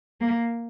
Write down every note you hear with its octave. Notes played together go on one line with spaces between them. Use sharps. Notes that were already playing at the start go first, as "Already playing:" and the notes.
A#3